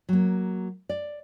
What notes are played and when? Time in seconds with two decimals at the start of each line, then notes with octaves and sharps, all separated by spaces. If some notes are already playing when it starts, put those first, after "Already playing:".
0.09 F#3 A#3
0.89 D5